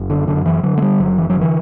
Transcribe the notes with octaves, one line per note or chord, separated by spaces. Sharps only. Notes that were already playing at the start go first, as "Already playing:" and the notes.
Already playing: F#1
D3
F#2 D3
E3
D3 F#3
A3
G3
F#1 F#3
E3
F#3
D3
E3